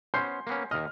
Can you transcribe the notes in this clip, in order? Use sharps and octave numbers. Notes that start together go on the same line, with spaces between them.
B3 C#4 C5 C6 G6 C7
A#3 B3 C#4
D#2 D#5 F6